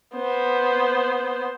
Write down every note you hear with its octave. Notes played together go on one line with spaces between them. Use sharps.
B3 C5